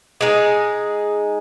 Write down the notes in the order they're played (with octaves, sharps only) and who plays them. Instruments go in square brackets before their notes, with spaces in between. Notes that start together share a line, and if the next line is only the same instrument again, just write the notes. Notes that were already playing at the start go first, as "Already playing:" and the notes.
[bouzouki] G#3 D#4 G#4